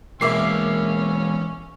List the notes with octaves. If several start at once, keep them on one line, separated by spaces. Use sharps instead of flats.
B2 E3 G#3 A#3 C#4 E5 D6 C7